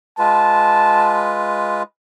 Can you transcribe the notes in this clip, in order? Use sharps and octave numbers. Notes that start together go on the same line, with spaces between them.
G#3 F4 B4 A5